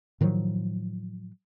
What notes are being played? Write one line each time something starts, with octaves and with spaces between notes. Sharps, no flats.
A2 D#3 F3 F#3